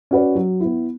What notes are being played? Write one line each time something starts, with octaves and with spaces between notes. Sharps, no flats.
C#4 F#4 B4 D5
F#3
B3 E4